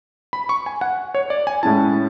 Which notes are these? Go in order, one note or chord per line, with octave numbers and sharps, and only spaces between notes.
B5
C#6
G#5
F#5
C#5
D5
G#5
A2 G#3 C#4 E4 A5